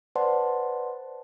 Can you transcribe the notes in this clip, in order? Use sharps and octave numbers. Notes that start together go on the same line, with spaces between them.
B4 C5 D5 F#5 A5 C6